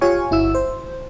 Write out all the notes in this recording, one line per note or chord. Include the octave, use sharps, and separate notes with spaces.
F4 G4 C#5 F5 G#5 C#6
G1 E4 F#4 E6
C5